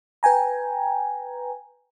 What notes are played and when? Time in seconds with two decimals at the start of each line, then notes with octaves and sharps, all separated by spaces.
0.23 B4 G5 G#5 A#5